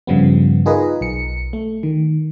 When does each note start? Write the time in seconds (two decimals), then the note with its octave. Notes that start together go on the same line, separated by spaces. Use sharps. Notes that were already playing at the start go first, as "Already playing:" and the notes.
0.07 G2 C#3 F3 G3 B3
0.66 D#4 F4 G#4 A#4 B4 D#5
1.01 B1 C#7
1.53 A3
1.83 D#3